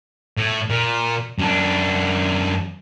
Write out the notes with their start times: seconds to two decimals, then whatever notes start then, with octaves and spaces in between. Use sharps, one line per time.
0.38 A2
0.70 A#2
1.38 F#2 D4